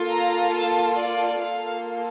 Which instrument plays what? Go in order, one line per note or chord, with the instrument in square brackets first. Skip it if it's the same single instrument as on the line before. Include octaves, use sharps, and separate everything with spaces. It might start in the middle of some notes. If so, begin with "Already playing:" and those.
Already playing: [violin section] A#3 F4 A4
A#5
A5
D5
A#3 F4 A4 F5